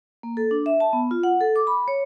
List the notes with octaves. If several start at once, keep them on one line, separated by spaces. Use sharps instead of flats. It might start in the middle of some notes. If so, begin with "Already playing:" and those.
A#3
A4
D4
E5
A5
B3
F4
F#5
A4
D6
B5
C#5